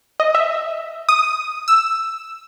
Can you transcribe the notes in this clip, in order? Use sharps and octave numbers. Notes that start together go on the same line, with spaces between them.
D#5
E5
D#6
E6